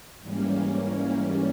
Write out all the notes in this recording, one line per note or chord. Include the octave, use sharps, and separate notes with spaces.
G#2 E3 G3 A#3 C#4